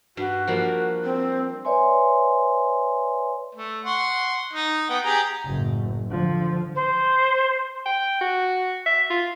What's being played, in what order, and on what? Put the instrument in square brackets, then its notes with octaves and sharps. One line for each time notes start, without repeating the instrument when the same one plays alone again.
[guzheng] G2 [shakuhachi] F#4
[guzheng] F3 G3 A#3
[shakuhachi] C4
[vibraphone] B4 C#5 D5 E5 G#5 C6
[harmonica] A3
F#5 C6 C#6
D#4
B3 F#5 G5
G4 G#4 A#5
[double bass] F#1 A2
D3 F3
[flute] C5
[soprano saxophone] G5
F#4
E5
F4